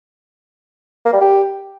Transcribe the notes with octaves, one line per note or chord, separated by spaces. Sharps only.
A#3
G3
G4